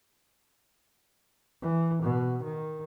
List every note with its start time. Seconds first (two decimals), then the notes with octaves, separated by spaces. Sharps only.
1.62 E3
2.03 B2
2.44 D#3